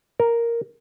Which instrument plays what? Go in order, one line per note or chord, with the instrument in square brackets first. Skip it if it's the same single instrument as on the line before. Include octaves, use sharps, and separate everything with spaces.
[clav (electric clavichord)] A#4